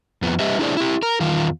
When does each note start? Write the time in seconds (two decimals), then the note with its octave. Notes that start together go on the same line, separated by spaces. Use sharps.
0.22 F2 B3
0.39 G3 G4 B4 D#5 E5
0.59 D4 E4 G#4 C5 D5
0.77 E4 G4
1.03 A#4
1.21 E2 D#3 F4